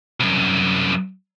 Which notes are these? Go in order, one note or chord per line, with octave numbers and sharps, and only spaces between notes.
C2 F#2